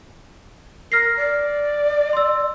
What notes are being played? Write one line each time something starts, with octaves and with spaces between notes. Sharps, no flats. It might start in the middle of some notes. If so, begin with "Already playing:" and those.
A#4 F6 A#6 C7
D5
C6 E6